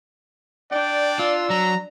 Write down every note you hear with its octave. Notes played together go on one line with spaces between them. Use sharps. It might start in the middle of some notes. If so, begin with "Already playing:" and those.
D4 D5 G5
F4 E6
F#3 A#5